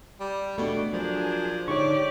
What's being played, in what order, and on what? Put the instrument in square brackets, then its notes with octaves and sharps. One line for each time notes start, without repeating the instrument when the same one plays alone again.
[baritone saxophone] G3
[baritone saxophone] B2 [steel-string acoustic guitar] A3 D4 [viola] D5
[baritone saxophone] F3 [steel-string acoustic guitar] F#3 A#4 [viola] D4 G#4
[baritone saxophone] G#2 [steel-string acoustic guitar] D3 D#4 [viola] G4 D5 [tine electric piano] C#5 C#6